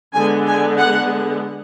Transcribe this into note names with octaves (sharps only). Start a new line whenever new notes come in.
D3 G#3 B3 G#5
G#5
F#5